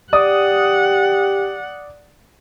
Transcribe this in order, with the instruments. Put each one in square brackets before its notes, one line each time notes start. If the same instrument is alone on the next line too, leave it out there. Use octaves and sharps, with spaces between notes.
[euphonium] G4 [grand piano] D5 D#6 [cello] F#5